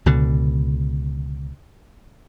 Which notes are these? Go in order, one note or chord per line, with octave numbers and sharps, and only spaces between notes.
C#2 B2 D3